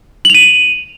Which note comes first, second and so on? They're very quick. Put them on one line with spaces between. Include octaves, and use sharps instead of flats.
F#7 F7 D#7